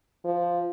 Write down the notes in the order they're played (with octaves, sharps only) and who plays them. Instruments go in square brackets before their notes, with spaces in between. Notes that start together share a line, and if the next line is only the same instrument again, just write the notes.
[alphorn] F3